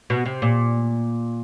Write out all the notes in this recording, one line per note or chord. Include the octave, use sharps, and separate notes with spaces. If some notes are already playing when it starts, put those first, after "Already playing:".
B2
C3
A#2